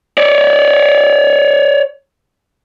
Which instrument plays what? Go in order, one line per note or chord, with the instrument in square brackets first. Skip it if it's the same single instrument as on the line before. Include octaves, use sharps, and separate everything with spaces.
[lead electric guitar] C#5 D5